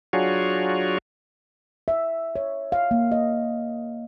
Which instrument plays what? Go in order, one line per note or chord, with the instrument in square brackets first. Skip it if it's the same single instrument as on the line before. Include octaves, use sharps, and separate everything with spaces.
[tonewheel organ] F#3 D4 F4 F#4 G#4 C#5
[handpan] E5
C#5
F5
A#3
D#5